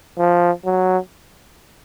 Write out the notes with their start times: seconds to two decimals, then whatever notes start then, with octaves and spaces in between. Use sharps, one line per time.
0.18 F3
0.65 F#3